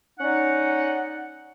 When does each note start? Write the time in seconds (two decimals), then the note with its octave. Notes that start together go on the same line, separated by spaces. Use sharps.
0.20 C#4 D#4 D5 F#5